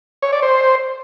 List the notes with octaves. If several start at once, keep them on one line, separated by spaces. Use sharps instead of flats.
C#5
D5
C5